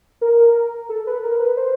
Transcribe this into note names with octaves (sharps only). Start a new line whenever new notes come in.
A#4
A4
B4
A#4
B4
C5